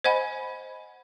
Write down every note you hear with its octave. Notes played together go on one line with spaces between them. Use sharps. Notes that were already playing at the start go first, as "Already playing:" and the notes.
C5 D#5 F#5 G#5 B5